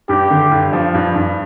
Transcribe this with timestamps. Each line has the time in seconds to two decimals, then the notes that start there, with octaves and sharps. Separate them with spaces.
0.09 G2 G4
0.30 D3
0.51 G2
0.73 F3
0.94 G2
1.16 G2